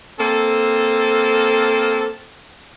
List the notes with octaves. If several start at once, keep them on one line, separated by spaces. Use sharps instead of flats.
A#3 C4 A4